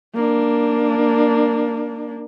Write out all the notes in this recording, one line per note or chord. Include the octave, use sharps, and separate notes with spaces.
A#3 D4